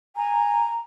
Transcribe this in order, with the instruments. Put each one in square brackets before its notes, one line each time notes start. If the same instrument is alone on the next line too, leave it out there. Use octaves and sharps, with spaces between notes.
[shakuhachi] G#5 [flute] A#5